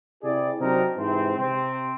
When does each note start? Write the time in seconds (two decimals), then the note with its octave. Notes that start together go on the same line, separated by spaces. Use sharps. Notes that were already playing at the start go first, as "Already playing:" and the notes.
0.24 C3 E4 G4 G#4 D5
0.60 C3 F#3 C4 D4 D#4 A#4
0.96 G#2 C3 E3 C4
1.37 C3 C4